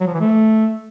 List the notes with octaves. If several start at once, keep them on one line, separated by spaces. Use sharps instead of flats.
F#3
F3
E3
A3